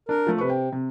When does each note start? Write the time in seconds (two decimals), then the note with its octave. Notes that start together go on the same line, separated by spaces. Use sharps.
0.09 D4 A#4
0.27 F3 A3
0.38 C3 B4 C#6
0.50 G5
0.72 C3